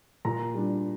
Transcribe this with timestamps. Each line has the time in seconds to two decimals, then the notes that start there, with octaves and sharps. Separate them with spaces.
0.25 A#2 A#5
0.54 G3 D4